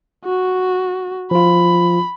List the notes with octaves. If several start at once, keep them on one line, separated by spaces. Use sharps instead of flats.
F#4
F3 F4 B5